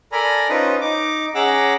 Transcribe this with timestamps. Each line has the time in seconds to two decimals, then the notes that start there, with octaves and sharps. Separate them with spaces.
0.12 A4 A#4 D5 G#5 A#5 B5
0.49 C#4 D#4 F4 B4 C5 D#5
0.81 D#4 D6
1.35 C#4 G#4 F#5 A#5 D6 E6